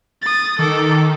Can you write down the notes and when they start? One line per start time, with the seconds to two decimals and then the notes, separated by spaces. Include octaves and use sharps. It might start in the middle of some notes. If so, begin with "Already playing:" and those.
0.22 D#6 A6
0.59 D#3 A4 D6